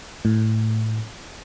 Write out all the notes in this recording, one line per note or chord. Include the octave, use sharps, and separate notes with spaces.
A2